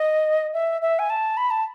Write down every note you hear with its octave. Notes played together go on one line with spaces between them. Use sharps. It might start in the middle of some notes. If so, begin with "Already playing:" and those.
Already playing: D#5
E5
E5
G#5
A5
B5
A5